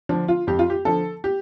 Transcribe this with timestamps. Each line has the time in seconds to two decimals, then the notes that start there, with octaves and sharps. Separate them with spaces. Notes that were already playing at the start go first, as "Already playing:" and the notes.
0.09 D3 F3 D4
0.28 F4
0.47 F2 G4
0.59 F4
0.70 G4
0.85 D3 F3 A4
1.24 G4